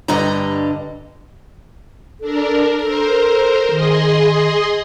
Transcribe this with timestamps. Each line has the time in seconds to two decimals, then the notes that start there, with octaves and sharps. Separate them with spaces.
0.08 G2 D3 G3 D#5 A#5
2.21 D4 A4 A#4
2.81 A4 A#4 C5
3.71 D#3 G#4 D#5 C6